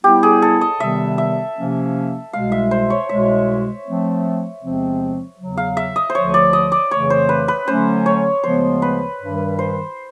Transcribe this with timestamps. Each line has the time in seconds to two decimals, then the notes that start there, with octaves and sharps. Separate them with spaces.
0.04 G3 B3 E4 G4
0.23 G#4
0.42 A4
0.61 D#5
0.80 C3 D#3 G3 B3 E5
1.18 E5
1.56 C3 F3 A#3 C#4
2.33 C2 B2 G#3 F5
2.52 E5
2.71 C5
2.90 C#5
3.09 C2 B2 G#3 E5
3.86 F3 A3 C4
4.62 E2 C3 F3 G#3 C4
5.38 E2 C#3 F#3
5.57 F5
5.77 E5
5.96 D#5
6.10 C5
6.15 D2 D3 F3 C#5
6.34 D5
6.53 D#5
6.72 D5
6.91 F2 C#3 E3 A3 C#5
7.10 C5
7.29 B4
7.48 B4
7.67 D3 F#3 A3 C#4 C5
8.06 C#5
8.44 D2 C#3 F3 G#3 B3 C5
8.82 B4
9.20 G2 D#3 G3
9.59 C5